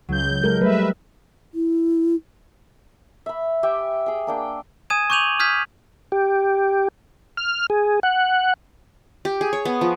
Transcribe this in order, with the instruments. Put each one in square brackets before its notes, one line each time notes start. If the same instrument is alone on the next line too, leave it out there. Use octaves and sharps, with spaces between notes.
[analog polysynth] C#2 G6 [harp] F#3
[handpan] G#3 A4 A#4
[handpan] G3 A3 [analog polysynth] B4 E5
[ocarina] E4
[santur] E5 B5
G4 E5 G5 G#5
G#4 G5
A#3 D4 G5
[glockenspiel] G#5 D#6 G#6 D#7 E7
C#6 D6 G6 D#7 F7 F#7
D#6 F6 G6 G#6 B6
[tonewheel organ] G4
F6
G#4
F#5
[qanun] G4
G#4
C#5
B3
F3